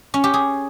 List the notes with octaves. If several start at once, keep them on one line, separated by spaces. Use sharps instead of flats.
C#4
G4
G#4